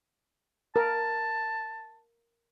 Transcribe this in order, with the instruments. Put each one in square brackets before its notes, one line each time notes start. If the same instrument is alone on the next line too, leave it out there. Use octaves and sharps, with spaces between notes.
[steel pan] A#4 [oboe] A5